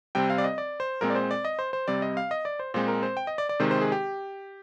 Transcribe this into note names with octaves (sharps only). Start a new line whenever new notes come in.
C3 G3 C4 G5
F5
D5
D#5
D5
C5
A#2 G#3 C4 A#4
D5
C5
D5
D#5
C5
C5
C3 G3 C4 D5
D#5
F5
D#5
D5
C5
A#2 G#3 C4 C5
A#4
C5
G5
D#5
D5
D5
C3 D#3 G#3 C4 C5
C5
G#4
G4